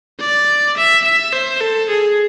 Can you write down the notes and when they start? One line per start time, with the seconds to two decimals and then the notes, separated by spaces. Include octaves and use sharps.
0.20 D5
0.77 E5
1.04 E5
1.32 C5
1.60 A4
1.89 G#4